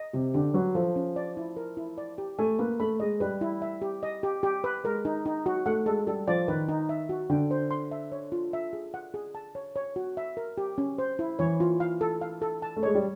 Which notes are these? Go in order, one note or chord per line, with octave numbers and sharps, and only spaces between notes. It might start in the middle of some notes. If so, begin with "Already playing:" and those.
Already playing: D#5
C3 G4
D3 G4
F#3 B4
F3 A4
C#4
D5
E4
A#4
E4
D5
G4
A3 G#5
A#3 B4
A3 B5
G#3 D#5
G3 B4
E4
E5
G4
D#5
G4
G4
B4
G#3 A#4
D#4
D#4
F#4
A3 F#5
G#3 A4
G3 A4
F3 D5
D#3 B4
D#4
E5
F#4
D3 G5
C5
C6
E5
C#5
F4
E5
G#4
F#5
G#4
A5
C#5
C#5
F#4
E5
A#4
G4
C#4
C5
E4
E3 C#5
F4
F5
A4
F5
A4
A5
A3
G#3 C#5
G3